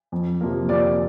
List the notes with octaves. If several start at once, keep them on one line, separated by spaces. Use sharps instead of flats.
F2
C3 F3 A#3
F2 D5 D6